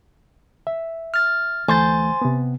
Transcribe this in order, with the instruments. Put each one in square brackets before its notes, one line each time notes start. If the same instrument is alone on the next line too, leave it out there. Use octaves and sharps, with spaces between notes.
[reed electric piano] E5
[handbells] F6 A6
[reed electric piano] D2 E3 A3 [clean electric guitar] C5 [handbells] G#5 A6
[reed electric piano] C3 B3